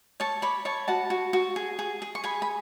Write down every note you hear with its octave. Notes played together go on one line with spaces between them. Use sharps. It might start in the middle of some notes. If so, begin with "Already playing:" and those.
C#5 A5 C#6
C#5 B5 D6
C#5 A5 C#6
F#4 F#5 A5
F#4
F#4
G#4
G#4
G#4
C#6
G#4 G#5 B5
B5